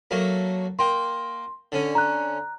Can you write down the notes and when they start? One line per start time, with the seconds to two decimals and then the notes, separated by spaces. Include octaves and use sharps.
0.11 F#3 A3 A#3
0.79 A#3 G5 C6
1.72 D3 C#4
1.95 A#5 F#6